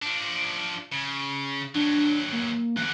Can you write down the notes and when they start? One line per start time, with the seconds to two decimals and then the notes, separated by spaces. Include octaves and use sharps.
0.02 F3 D4
0.92 C#3
1.75 D#2 F#3 D4
2.32 A#3
2.77 E2 D3 F#6